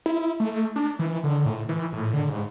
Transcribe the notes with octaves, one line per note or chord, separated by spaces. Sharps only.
E4
A3
D4
E3
D3
A2
E3
A2
D3
G#2